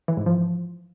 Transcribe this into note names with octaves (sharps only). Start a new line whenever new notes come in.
E3
G#2
F3